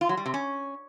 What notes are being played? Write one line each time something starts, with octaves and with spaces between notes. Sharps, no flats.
F4
F#3
G3
C3
C#4